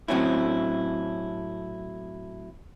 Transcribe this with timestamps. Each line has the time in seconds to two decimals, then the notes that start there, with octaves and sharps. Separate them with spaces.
0.08 A2 F#3 C4 C#4 E4